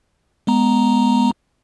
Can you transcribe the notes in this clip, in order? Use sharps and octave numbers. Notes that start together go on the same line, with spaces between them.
G#3 B3 A#5